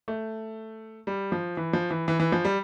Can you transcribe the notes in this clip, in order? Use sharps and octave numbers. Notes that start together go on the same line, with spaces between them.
A3
G3
F3
E3
F3
E3
E3
E3
F3
G3